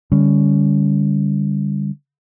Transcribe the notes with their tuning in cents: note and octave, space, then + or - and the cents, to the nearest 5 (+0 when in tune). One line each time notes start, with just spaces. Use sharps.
D3 +0 G3 +25 C#4 +10